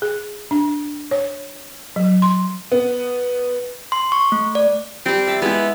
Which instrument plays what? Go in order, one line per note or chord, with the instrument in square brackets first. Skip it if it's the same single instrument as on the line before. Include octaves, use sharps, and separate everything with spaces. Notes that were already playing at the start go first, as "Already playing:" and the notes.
[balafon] G#4
D4
C#5
F#3
C6
[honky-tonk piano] B3
[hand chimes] C6
C#6
A3
D5
[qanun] G3 G4 [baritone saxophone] C4
[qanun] E5 A5
[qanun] G#3 E4 [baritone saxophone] B3